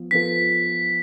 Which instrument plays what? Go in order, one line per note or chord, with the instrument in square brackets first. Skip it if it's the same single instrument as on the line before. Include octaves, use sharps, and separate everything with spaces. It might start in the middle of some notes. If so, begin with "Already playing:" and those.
Already playing: [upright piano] F3 B3
[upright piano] F3 B3 F4 A4 [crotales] B6